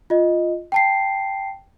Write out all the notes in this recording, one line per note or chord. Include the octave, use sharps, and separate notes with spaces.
F4 D#5
G5 A5 C7